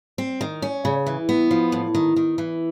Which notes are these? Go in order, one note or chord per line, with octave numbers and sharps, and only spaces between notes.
C4
D#3
C#4
C#3
E3
B3
F3
A2
D#3
D#3
E3